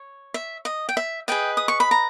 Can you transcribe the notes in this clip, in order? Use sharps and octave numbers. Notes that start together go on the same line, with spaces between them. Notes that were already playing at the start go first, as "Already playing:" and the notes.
Already playing: C#5
E5
D#5
G5
E5
G#4 B4 D#5 G5
D#6
C#6
B5
A#5